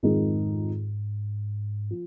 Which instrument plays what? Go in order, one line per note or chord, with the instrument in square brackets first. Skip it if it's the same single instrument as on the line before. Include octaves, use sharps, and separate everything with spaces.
[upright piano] F2 D#3 G#3 D#4 G#4 [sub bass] G#2
[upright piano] F3